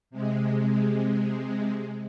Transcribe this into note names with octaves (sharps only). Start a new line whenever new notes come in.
C3 G#3